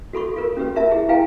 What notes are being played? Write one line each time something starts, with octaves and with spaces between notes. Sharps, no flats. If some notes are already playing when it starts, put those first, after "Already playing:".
F#4 A4 B5 C#6
F4 A4 A#4
C#4 F#4 G4 B4
F4 A#4 E5 A5
E4 G4 G#4
E4 B4 F5 G5 G#5 A#5